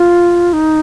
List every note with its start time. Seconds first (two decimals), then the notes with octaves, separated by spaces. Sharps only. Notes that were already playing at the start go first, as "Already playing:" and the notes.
Already playing: F4
0.53 D#4